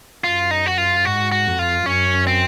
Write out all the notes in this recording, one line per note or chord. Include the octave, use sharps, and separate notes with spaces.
F#2 F4
D#4
F#4
F4
G#2 F#4
F#4
F2
F4
F#2 C#4
C4